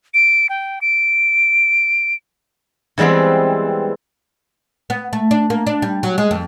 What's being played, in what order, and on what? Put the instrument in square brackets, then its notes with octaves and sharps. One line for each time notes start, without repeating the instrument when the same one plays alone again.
[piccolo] D7
G5
D7
[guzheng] E3 G3 G#3 B3 C4
[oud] B3
A3
D4
A#3
D4
G3
F#3
G#3
F2